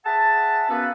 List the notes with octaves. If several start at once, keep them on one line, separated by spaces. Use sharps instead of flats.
G#4 E5 F#5 A5
A#3 B3 C#4 F#4 A4 B4